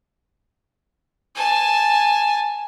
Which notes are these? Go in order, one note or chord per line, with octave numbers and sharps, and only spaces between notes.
G#5 A5